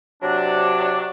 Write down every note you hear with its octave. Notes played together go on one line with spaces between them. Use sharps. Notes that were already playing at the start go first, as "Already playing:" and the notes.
C3 F#3 D4